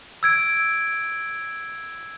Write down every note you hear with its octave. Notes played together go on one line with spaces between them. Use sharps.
E6 G#6 D7